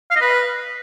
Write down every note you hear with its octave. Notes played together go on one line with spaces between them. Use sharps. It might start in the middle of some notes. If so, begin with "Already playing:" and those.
F5
D#5
B4